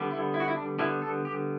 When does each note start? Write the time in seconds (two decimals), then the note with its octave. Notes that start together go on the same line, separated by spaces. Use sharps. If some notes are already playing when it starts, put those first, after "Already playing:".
Already playing: D3 G3 B3
0.11 E4
0.34 E4
0.40 F#4
0.48 E4
0.56 D4
0.79 D3 G3 B3 E4
1.02 A4
1.25 G4